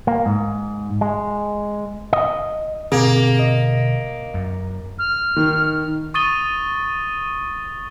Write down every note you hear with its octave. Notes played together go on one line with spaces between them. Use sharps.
A#3
G#2
G#3
D#5
B2 D3 A#3 C4 G#4
D#5
F#2
F6
D#3
C#6 D#6 A6 D#7 G7